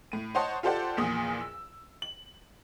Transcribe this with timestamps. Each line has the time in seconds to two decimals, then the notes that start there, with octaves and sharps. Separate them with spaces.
0.12 A2 D#7
0.35 C5 C#5 D#5 F#5 A5 C6
0.63 F4 G4 A4 C5 D5 F#5
0.97 A#1 E2 A#2 D#6
1.41 E6
2.02 F#7